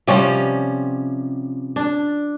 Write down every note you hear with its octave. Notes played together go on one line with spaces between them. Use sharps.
C3 F3 G3 C#4
D4